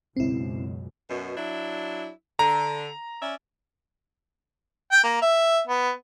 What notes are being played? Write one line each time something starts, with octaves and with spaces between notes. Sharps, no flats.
C#2 F#2 B2 C4 E4
F#2 B2
F#3 D4 E4
D3 A#5
C#4 D5 E5
G5
A#3
E5
B3